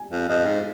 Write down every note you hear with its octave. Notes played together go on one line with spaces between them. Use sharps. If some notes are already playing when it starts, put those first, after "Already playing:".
Already playing: G#5
F2
F2 D#5
G#2